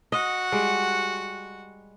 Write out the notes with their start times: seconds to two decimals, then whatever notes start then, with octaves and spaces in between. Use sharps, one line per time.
0.12 F#4 D#5 F#5
0.52 G3 G#3